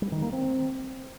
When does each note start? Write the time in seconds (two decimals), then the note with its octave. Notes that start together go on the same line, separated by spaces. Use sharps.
0.02 G3
0.12 D#3
0.22 A#3
0.32 C4